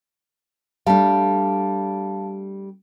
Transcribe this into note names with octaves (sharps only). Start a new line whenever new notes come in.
G3 A3 D4 F5 A5